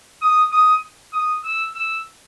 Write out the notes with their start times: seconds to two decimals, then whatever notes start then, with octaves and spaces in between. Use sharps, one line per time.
0.21 D#6
0.52 D#6
1.13 D#6
1.44 E6
1.74 E6